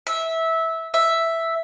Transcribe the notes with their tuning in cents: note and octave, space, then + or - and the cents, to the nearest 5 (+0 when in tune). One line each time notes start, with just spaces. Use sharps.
E5 -15
E5 +0